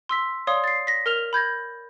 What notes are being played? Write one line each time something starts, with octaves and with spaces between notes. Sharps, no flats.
C6 E6 B6
C#5 D5 F5 C6 D#6
A6 C7
A#6 B6
A#4 F6 F7
B5 G6 G#6 A#6